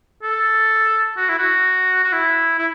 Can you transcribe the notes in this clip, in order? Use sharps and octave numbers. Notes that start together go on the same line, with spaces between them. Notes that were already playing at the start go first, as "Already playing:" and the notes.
A4
F#4
E4
F#4
F#4
E4
E4